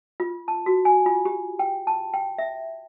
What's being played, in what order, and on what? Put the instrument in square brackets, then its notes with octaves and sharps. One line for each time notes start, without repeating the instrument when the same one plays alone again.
[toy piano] F4
A5
F#4
G#5
F4
G4
G5
A5
G5
E5